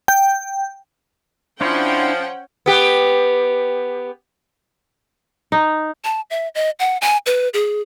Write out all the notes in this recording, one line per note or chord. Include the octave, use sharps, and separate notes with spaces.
G5
F3 C#4 D4 E4 C5 C#5 F#5 G5
B3 G4
D#4
A5
E5
D#5
F#5
G#5
B4
G#4